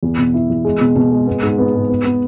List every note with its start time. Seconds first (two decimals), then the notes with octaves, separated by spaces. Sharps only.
0.03 E2
0.18 B2
0.34 E4
0.49 E2
0.65 G#3
0.81 B2
0.96 B2
1.12 G#3
1.27 B3
1.43 G#2
1.58 B3
1.74 G#2
1.89 B3
2.05 B3